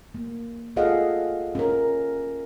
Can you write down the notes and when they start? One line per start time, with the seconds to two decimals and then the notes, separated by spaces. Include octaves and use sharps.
0.15 A#3
0.76 F4 G#4 A4 D#5 F5 F#5
1.55 C#4 A#4